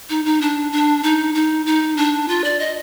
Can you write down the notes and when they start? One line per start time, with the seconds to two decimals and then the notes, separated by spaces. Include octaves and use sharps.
0.10 D#4
0.25 D#4
0.41 D4
0.72 D4
1.03 D#4
1.35 D#4
1.66 D#4
1.97 D4
2.28 F4
2.44 D5
2.59 D#5